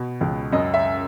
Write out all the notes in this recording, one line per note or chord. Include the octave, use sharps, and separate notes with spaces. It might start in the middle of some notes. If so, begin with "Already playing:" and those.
Already playing: B2
C#2
F#2 D#5
E5